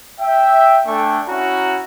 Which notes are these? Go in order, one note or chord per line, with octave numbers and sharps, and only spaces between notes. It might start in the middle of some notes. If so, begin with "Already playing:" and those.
E5 G5
A3 D4 A4 G5 G#5 C#6
C#4 E4 F#4 A#5